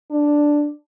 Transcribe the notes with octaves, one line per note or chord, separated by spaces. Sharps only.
D4